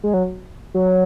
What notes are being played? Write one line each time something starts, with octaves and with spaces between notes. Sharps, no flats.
G#3
F#3
F#3